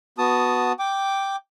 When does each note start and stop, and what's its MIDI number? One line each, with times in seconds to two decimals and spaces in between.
0.18 0.72 59
0.18 0.72 66
0.18 0.72 81
0.18 0.72 87
0.79 1.36 79
0.79 1.36 86